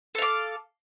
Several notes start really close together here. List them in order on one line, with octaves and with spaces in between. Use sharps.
A4 F5 D6